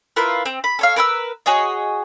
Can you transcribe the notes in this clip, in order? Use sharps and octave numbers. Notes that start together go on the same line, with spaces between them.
E4 F4 A#4 B4
C4
B5
A4 C#5 F5
A#4 B4 G5 E6
F#4 G#4 C#5 D#5